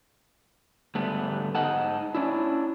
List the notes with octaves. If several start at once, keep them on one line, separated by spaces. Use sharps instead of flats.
G#2 D3 G3 A3 B3 D4
G#2 D#4 D#5 F#5 A5
C#4 D4 E4